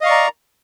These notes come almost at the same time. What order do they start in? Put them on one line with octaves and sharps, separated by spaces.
D#5 F5 C#6 D5 A#5